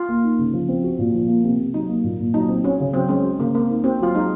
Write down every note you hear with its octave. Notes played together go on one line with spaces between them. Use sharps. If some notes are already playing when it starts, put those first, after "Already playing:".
Already playing: F4
A#3
D#4
C#3
F3
C4
F#4
A#2
F3
A#3
C3
C3
F#3 D#4
A#3
A#2
A#2
F#3 D#4
C4
C#4 F#4
C#3
F#3 C4
G#3 C#4
F#4
C#3 A#3
A#3 C4
D#4
C4 F#4
F#3 F4
G#3 D#4